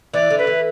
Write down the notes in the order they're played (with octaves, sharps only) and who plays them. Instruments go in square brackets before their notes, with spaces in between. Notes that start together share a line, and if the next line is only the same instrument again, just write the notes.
[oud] E3 [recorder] D5
[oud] D3
[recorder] B4
[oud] E3